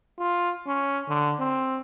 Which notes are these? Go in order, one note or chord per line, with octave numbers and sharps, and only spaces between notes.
F4
C#4
D3
C4